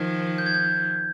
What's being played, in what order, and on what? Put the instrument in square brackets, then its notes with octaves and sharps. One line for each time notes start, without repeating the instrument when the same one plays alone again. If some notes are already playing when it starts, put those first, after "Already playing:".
Already playing: [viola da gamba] D#3 F3 [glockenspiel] G#6
[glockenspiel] G6
G#6
G6